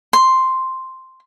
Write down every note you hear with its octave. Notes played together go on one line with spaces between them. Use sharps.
C6